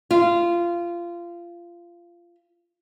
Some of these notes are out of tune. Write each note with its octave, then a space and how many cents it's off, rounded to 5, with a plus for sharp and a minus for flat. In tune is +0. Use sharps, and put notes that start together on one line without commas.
F4 -20